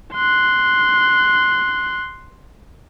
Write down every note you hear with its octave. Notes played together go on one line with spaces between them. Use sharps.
C6 F#6